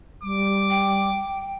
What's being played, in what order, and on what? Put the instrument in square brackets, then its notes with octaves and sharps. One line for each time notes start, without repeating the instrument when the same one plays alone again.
[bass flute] G3 [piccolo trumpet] D6
[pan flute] G5